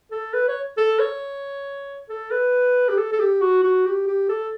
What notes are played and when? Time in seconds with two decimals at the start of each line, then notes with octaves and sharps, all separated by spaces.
0.11 A4
0.34 B4
0.48 C#5
0.78 A4
0.99 C#5
2.09 A4
2.31 B4
2.89 G4
2.98 A4
3.12 A4
3.19 G4
3.41 F#4
3.63 F#4
3.86 G4
4.07 G4
4.29 A4